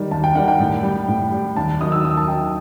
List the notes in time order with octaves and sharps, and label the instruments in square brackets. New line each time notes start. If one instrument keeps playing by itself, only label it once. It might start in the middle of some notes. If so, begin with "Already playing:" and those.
Already playing: [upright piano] D#3 G3
D#2 A5
G5
D#3 G3 F#5
G5
A2
G3
A2
G3
D#2 A5
D#3 F#3 D#6
E6
D#2 D#6
A5
D#3 F#3 G5